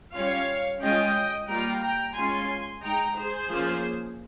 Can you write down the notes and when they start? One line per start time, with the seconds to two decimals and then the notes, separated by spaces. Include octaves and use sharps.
0.13 G3 C#4 F4 C#5 F5
0.80 G#3 C#4 F4 D#5 G5
1.47 G3 A#3 F4 G5 A#5
1.80 G5 A#5
2.14 G#3 C#4 F4 G#5 C6
2.82 G#3 D#4 G5 A#5
3.15 G#4 C5
3.50 F3 A#3 C#4 F4